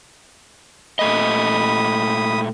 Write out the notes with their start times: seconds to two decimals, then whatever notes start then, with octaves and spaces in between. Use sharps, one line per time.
0.99 A#2 A3 D#5 B5 D#6